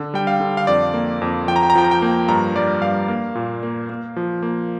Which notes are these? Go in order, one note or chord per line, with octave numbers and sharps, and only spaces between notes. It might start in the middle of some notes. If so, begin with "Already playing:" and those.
Already playing: D3
G3 G5
F5
D3
F5
F2 D5
A#3
F2
F3 G5
A#5
G5
A#5
F3 G5
A#5
G5
A#3
G2 A#5
G3 D5
G2 F5
A#3
A#2
A#3
A#3
F3
A#3